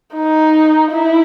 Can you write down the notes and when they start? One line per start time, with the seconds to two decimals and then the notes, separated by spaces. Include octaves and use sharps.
0.14 D#4
0.92 E4